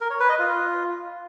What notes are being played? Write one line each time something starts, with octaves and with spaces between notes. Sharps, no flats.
A#4
C#5
B4
D#5
F4